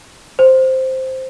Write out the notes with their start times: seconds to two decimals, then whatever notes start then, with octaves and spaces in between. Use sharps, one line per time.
0.39 C5